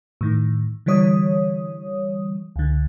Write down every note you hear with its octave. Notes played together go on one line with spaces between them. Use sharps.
A2 D#3
D3 E3 G3 C#5 D#6
C#2 D3